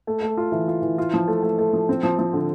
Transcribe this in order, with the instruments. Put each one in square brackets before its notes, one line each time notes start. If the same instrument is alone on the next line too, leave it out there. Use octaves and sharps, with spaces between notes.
[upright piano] A3
A3
F4
E3
F4
E3
F4
F3
A3
A3
A3
F3
C4
F3
F3
D3